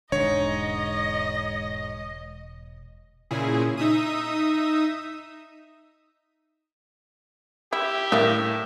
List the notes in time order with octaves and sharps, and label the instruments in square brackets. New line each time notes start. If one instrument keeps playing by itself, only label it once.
[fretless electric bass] E1 D3 D4 [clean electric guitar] G#2 [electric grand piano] C#5 [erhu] D#5
[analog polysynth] A#2 C#3 E4 G#4
D#4 E5 D#6
[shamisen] E4 [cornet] G4 [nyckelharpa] E5
[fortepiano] A2 [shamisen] A#3 D4